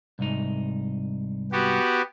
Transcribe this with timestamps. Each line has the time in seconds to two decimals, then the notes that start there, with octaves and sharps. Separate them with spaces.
0.19 C2 G#2 D#4
1.52 B3 F#4 G4